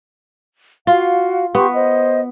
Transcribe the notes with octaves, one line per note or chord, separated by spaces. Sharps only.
F4 F#4 F5
B3 G4 C6 C#6
C5 D#5